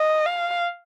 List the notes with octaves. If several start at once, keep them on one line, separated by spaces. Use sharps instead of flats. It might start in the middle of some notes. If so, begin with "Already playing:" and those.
Already playing: D#5
F5